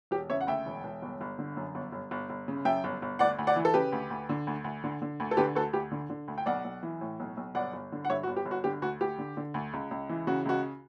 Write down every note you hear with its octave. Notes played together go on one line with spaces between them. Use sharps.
E1 G4
C#3 C#5 E5
F#5
D2 E5 G5
E1
E1
G1
G1
D3
F#2
G1
G1
G1
G1
C#3
F#2 E5 G5
G1
G1
D2 D5 F#5
D2
D5 F#5
E3
A4
C#3 G4 B4
D2
D2
D3
D2
D2
D3
D3
D2
A4
D3 G4 B4
D2 F#4 A4
D2 G4
D3
D3
D2
G5
B1 D5 F#5
B1
E3
A2
B1
B1
G1 D5 F#5
G1
D3
F#5
G2 C#5 E5
F#4
G1
G4
G1
F#4
D3 G4
D2 F#4
D2 G4
D3
D3
D2
C#2
C#2
E3
C#3 F#4
C#2 F#4